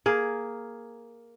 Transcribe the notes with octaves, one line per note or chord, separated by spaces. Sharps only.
A#3 G#4